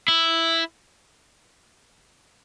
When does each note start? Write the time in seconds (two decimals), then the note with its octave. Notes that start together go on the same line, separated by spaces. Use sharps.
0.08 E4